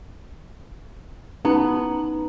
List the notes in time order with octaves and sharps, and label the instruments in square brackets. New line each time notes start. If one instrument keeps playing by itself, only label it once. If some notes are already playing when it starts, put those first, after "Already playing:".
[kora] B3 [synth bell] C#4 D#4 A#5